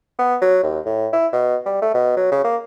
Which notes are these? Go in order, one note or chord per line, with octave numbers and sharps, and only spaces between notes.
B3
F#3
D#2
A2
E4
B2
G3
A3
B2
F#3
C#3
A#3